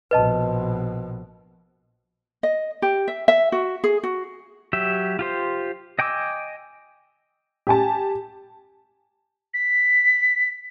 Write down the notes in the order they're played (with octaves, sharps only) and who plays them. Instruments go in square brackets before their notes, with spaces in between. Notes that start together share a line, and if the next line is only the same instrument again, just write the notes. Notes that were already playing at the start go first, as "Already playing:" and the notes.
[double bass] A#1 B2 [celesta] B4 D#5 A5
[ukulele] D#5
G4
E5
E5
F#4
G#4
F#4
[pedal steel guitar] F#3 G4 E5
F4 G4 C5
D#5 G5 G#5 D6 E6
[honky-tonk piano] G4 G#5 A5
[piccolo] B6